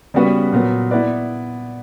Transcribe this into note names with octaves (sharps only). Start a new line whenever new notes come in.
C#3 G3 B3 F#4 B4
A#2 F#3 B3
B3 E4 B4 D5